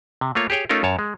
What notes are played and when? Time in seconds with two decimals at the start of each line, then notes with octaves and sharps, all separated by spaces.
0.21 C3
0.35 A3 A#3 F4 C#5
0.50 G4 G#4 C#5 G5
0.69 A3 C#4 D#4 F4 A4 A#4
0.83 F#2 C#5 A5
0.99 G#3